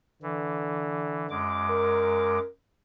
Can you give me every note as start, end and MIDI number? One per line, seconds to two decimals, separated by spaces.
0.22 1.41 50
0.22 1.26 52
1.30 2.39 42
1.30 2.39 56
1.30 2.39 86
1.70 2.48 70